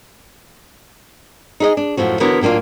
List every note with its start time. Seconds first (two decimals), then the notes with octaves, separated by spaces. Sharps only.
1.60 D#4 G#4 D#5
1.77 D4
1.97 F#2 A2 F3 F#4
2.20 D3 E3 B3 F#4 A#4 C#5
2.41 A2 F#3 A#3 D4 F4